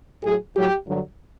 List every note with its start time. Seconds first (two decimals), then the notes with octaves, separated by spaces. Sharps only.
0.24 A2 F#3 G#4
0.56 A2 F#3 G4
0.88 G2 D3 F#3